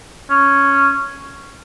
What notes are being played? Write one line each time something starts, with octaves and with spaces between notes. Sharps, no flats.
C#4